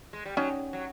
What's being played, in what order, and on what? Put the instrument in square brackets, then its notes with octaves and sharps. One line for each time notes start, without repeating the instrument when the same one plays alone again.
[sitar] G#3
G3
[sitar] F#3 [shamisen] C#4 D#4
[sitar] F#3